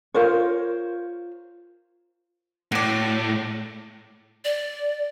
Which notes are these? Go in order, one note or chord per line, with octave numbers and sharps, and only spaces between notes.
F4 A#4 C5 C#5
A2 F#4 D5
D5